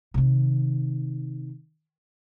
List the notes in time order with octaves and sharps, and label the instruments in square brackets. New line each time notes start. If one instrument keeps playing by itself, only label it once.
[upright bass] C3 D#3